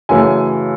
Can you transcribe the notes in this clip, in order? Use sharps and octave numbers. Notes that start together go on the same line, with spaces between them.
F#2 C#3 E3 A3 G#5